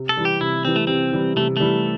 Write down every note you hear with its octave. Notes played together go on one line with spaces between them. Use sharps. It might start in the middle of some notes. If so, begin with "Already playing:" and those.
Already playing: C3
A4
E3 G3
G4
C3 E4
E3 G3 C4
A3
C3 C4
E3 G3
C3 A3
E3 G3 A3